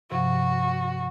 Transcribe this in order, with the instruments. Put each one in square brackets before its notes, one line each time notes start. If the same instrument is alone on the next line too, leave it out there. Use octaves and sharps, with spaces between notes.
[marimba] G2 C3 F3 [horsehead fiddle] F#4